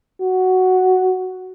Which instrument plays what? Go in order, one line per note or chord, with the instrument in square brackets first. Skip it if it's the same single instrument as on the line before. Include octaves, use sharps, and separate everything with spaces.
[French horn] F#4